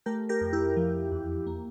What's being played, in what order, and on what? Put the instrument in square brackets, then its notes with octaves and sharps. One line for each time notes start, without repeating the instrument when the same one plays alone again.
[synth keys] A3 G4 A#4
G4 A#4
F2
E4 G4
F3
E2
A#3